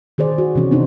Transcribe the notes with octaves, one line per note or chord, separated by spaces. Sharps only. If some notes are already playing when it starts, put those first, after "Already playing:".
D#3 G#4 C5 D5
F#4
C3 E3 C#4
C4 D4 D#4 C5